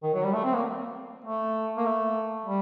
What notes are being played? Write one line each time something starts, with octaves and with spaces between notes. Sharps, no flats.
D#3
F#3
G3
A3
C4
A#3
A3
A#3
A3
G3